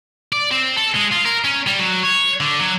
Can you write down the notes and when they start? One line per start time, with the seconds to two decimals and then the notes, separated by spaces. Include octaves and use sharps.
0.32 D5
0.51 C4
0.77 A4
0.96 G#3
1.12 F4
1.26 A#4
1.45 C#4
1.67 G3
1.79 F#3
2.03 C#5
2.40 D3
2.60 F#3